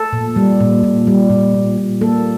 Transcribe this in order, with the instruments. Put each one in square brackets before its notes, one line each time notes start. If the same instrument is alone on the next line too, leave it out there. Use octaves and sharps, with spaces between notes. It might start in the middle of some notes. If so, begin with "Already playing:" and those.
Already playing: [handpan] A4
A#2
G3
A#2
A#2
G3
A#2
A#2
A#2
A#3 A4